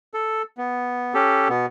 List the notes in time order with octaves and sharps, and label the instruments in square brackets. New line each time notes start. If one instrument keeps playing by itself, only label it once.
[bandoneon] A4
B3
C#4 G4 A4
B2 B3